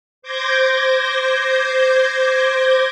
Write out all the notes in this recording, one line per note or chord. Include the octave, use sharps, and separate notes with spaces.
C5 D6 G6 G#6 A#6